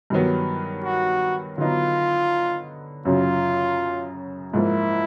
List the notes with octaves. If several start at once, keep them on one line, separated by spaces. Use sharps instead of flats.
G2 D#3 F#3 B3
F#4
D3 F#3 B3 D#4 F4
F#2 C#3 F#3 F4
G#2 F3 A#3 E4